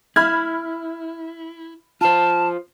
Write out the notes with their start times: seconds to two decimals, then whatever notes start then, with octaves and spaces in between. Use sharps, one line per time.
0.16 E4 B5 F6 G#6
2.01 F4 C5 A5